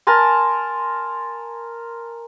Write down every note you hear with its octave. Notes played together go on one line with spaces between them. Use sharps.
A#4 G#5 A5 C6